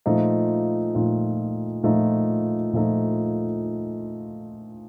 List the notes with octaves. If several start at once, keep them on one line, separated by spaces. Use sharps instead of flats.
A#2 F3 A3 D#4
A#2 F3 A3 D#4
A#2 F3 A3 D#4
A#2 F3 A3 D#4